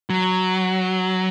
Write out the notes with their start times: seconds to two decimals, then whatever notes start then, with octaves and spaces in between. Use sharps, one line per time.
0.10 F#3